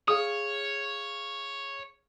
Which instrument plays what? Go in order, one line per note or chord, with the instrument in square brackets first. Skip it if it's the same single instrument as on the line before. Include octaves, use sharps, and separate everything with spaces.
[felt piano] G#4 F5 [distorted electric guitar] C#5 [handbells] D#6